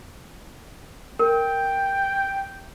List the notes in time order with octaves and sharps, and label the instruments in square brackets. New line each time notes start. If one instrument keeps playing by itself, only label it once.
[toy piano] A#4 [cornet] G5